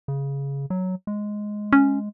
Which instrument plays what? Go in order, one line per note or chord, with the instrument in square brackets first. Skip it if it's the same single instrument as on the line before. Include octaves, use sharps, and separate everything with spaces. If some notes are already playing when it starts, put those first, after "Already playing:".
[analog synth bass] C#3
F#3
G#3
[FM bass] C#4